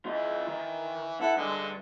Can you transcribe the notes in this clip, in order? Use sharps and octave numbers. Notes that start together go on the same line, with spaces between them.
E3 F4 D#5
D#3
E4 A4 B4 F#5
G2 D3 G#3